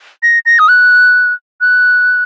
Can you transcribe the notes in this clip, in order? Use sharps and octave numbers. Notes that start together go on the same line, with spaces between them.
A#6
A#6
D#6
F#6
F#6